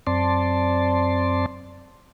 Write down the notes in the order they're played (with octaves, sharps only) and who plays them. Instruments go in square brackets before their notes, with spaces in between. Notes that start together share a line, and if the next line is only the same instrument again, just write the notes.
[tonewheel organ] F#2 C4 D5 A5 C6